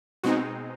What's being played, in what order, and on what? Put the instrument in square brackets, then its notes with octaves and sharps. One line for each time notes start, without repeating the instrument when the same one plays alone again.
[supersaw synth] B2 G#3 C4 D#4 F#4